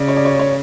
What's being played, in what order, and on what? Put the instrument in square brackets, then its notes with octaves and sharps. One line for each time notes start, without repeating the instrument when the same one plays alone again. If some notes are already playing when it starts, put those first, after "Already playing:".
Already playing: [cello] C#3 [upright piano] D5
[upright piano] C#5
D5
C#5
C#5